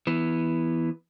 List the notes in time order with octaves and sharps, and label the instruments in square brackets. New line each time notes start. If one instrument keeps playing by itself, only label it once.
[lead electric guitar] E3 B3